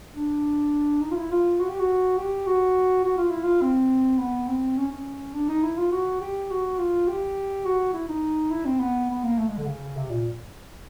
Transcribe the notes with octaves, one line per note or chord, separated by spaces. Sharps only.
D4
D#4
F4
E4
F4
F#4
G4
F#4
G4
F#4
F#4
F4
E4
F4
C4
B3
C4
C#4
C#4
D4
D#4
E4
F4
F#4
G4
F#4
F4
G4
F#4
E4
D#4
E4
C4
B3
B3
A#3
A3
G#3
D3
C#3
C3
A#2